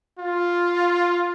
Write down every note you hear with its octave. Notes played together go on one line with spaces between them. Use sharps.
F4